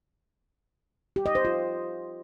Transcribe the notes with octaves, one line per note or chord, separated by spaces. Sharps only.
G4
D#5
C5
F4